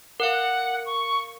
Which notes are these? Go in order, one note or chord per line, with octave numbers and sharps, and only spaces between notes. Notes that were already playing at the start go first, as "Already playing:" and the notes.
A#4 F5 F#5
C#6